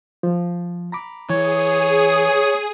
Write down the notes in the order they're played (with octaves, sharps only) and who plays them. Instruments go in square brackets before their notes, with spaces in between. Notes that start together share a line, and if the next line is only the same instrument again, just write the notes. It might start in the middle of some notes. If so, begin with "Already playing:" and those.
[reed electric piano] F3
A#5 B5 D6
[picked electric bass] E3 [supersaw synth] G#4 D#6 [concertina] C#5